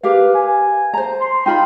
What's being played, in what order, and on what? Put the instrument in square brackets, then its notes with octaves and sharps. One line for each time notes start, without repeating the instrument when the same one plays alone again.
[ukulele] G4 A#4 F5 [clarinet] B4
[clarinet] G#5
[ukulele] C5 A#5
[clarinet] C6
[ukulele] D#4 F4 B5 [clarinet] G5